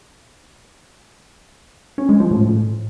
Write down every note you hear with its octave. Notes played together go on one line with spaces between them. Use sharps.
C#4
G#3
F3
A2